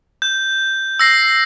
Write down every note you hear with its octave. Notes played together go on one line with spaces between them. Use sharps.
G6
E6 A#6 C7